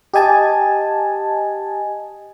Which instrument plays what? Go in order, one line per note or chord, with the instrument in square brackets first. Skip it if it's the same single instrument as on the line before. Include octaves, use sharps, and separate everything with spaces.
[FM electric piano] G4 D#5 G#5 A5